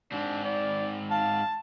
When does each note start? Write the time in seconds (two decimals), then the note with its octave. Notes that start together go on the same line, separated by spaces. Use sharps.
0.12 G#2 C4 D4
0.44 D5
1.11 F5 A5